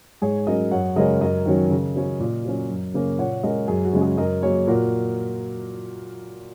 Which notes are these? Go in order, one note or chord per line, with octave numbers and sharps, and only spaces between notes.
G#2 G#4 C#5
F#3 C#4 A#4 D#5
F#2 C#5 F#5
C#3 G#3 C#4 A#4 D#5
F#2 A#4 D#5
D#3 F#3 C#4
C#3
F#3 C#4
A#2
F#3 C#4
F#2
C#3 A#3 C#4
A#2 C#5 F#5
G#3 C#4 A#4 D#5
F#2 G#4
F#4
C#3 G#3 C#4
G#4
F#2 A#4 D#5
F#3 A#3 G#4 C#5
A#2 F#4 A#4